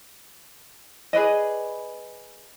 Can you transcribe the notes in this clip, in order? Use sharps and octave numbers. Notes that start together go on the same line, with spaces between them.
G#4 B4 D5 D#5